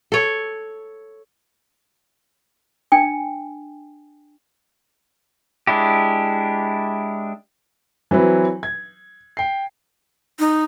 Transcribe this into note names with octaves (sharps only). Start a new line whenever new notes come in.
A4 C#5
D4 G5 G#5
G#3 D4 E4 G4
E3 F#3 C4 B4
G#6
G5 C7
D#4